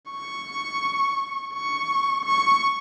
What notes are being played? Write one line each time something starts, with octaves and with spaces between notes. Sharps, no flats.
C#6
C#6
C#6